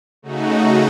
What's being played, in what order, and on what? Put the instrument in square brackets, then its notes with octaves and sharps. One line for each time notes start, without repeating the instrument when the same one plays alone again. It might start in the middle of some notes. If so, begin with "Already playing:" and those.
[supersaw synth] C#3 A3 D#4 F#4